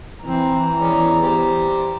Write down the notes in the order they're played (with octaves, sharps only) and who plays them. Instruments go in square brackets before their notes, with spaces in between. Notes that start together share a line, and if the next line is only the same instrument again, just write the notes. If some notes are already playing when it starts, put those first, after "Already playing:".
[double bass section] E3 [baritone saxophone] C4 [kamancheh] A#5
[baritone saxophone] E2 [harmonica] G#3 C#4 D5
[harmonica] G3 G4 C5